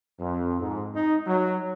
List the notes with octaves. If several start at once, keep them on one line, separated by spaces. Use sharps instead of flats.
F2
G#2
D#4
F#3